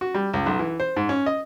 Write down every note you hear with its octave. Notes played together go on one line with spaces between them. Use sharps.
F#4
G3
C#2
B1
E3
C5
G#2
C#4
D#5